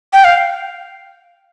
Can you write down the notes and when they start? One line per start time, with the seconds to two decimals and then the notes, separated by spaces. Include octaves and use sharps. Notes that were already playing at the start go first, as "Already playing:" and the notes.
0.13 G5
0.24 F5